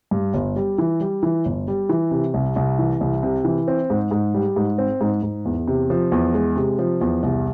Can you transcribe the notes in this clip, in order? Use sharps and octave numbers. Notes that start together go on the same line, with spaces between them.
G2
G1
G3
E3
G3
E3
G1
G3
E3
C3
C2
C2
E3
C2
C3
E3
C4
G#2
G#2
G3
G#2
C4
G#2
G#2
E2
C3
F3
E2
G#3
C3
F3
E2
C2